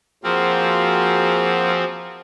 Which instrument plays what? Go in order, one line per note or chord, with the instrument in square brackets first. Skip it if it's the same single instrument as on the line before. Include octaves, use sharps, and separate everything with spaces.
[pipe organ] F3 C4 [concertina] A#3 F4 F5 [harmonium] F#4 G#4 C5